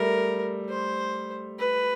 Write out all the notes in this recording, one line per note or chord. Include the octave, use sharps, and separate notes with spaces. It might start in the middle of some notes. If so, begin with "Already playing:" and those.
Already playing: G3 A3 A#4
C5
B4